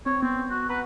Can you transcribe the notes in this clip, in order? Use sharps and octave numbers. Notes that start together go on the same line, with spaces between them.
C4 C#5
B3 C4
F#4
B4 F#5 A#5